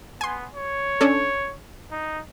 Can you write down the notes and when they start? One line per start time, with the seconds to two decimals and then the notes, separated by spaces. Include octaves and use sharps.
0.21 B3 G#5 C6
0.55 C#5
1.01 C#4 D4 A4
1.91 D#4